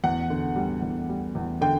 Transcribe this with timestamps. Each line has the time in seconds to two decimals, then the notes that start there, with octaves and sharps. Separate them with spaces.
0.04 E2 F#5
0.30 D3
0.56 G3
0.82 E2
1.09 G3
1.35 E2
1.61 D3 G5